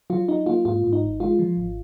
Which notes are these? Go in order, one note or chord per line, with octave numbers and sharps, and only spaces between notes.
F#3 F4
F#3 D#4
A#3 F4
G#2 F4
G#2
D#4
G#1
G#3 F4
F3
G#1